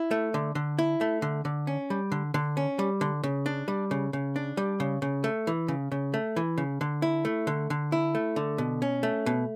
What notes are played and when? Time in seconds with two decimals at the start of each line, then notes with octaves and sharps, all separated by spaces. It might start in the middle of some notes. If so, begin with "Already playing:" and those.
Already playing: E4
0.11 A3
0.34 D3
0.55 D3
0.79 E4
1.01 A3
1.22 D3
1.45 D3
1.67 C#4
1.90 G3
2.12 D3
2.34 D3
2.57 C#4
2.79 G3
3.01 D3
3.24 C#3
3.46 D4
3.68 G3
3.91 C#3
4.13 C#3
4.36 D4
4.57 G3
4.80 C#3
5.02 C#3
5.24 A3
5.47 E3
5.68 C#3
5.92 C#3
6.14 A3
6.36 E3
6.58 C#3
6.81 D3
7.02 E4
7.25 A3
7.47 D3
7.70 D3
7.92 E4
8.15 A3
8.36 D3
8.58 B2
8.82 C#4
9.03 A3
9.26 B2